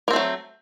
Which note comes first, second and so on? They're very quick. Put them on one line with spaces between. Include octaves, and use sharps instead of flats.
A#3 C4 A3 F#3